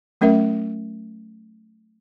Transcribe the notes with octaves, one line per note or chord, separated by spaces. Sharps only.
F#3 A3 C#4 A#4 E5